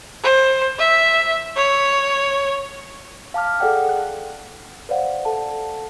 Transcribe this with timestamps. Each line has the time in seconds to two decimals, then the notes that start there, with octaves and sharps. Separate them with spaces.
0.24 C5
0.78 E5
1.57 C#5
3.34 F5 A5 D6 F6
3.60 G#4 A4 D5 F#5 G5
3.89 F#6
4.89 B4 C5 D5 F5 F#5
5.25 A4 F#5 A5